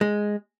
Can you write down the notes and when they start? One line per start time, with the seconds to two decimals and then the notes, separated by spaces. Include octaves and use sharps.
0.01 G#3